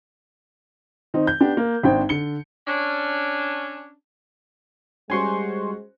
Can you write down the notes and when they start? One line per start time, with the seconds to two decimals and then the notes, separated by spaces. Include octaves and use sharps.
1.14 D#3 C4 D#4
1.27 G6
1.40 B3 D4 G4
1.57 A#3
1.83 G#1 C4 D4 G5
2.09 D3 C#7 G7
2.67 C#4 D4
5.10 G3 G#3 C#4 F#4 C5 G#5 C6 C#6